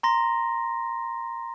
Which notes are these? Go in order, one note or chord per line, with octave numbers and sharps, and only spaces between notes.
A#5 C6 A#6